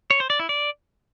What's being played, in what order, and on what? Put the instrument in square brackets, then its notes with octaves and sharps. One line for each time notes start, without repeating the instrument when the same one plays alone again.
[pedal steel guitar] C#5
C5
D5
E4
D5